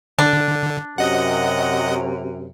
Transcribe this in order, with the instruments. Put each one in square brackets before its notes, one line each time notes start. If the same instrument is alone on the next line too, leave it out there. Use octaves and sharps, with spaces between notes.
[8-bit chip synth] D3 [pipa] D4
[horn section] F#2 C3 [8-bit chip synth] D#5 F#5